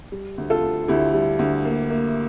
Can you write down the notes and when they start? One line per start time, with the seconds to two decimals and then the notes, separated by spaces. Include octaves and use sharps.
0.12 G3
0.38 D2
0.50 F4 A4
0.63 D2
0.88 D2 E4 G4
1.14 G3
1.39 D2
1.65 A#3
1.90 A#3